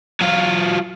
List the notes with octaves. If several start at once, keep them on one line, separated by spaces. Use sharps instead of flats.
F#3 F4